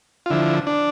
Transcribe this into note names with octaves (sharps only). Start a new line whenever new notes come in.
F4
D3 F3 E4
D4